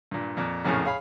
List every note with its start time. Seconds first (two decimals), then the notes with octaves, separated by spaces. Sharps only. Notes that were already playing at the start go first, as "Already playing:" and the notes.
0.11 G2 A#2
0.37 F2 A#2
0.65 A#1 F2 A2 C#3 G#4 F6
0.85 G#4 C#5 F5 B5